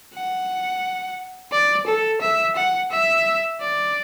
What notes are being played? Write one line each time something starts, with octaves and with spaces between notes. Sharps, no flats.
F#5
D5
A4
E5
F#5
E5
D5